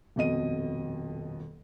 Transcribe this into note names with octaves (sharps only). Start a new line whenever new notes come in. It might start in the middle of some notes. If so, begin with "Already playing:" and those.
D#1 F2 B2 D#5 D#7